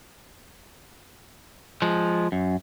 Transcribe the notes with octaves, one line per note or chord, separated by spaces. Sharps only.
F3 G#3
F#2